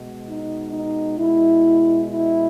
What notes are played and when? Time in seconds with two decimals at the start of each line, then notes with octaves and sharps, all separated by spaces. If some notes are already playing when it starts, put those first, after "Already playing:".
Already playing: B2 G#3
0.27 D#4
0.72 D#4
1.18 B2 G#3 E4
2.11 E4